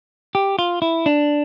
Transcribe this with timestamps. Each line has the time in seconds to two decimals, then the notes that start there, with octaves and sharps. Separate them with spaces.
0.35 G4
0.59 F4
0.82 E4
1.06 D4